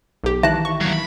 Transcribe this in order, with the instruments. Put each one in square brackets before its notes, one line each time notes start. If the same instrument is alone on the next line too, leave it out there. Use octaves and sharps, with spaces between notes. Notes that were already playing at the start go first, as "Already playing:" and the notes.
[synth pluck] B1 G4
[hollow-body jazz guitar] D#3 E3 [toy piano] E5 [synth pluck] A5 F#6
[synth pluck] C#6
[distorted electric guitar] F#3 A#3
B5